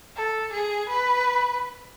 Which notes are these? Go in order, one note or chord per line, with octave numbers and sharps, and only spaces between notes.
A4
G#4
B4